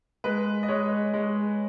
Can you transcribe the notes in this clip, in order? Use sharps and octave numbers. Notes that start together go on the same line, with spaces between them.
G#3 B4
D#5
G#3 C#5
G#3